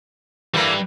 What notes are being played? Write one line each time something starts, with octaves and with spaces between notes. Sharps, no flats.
E3 G3 A3 A#3 B4